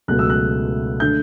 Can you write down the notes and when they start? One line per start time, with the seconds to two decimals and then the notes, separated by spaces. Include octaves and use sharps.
0.08 C#2 B2 F#3 A3 F#6
0.19 E6
0.30 F#6
1.00 D3 A3 G6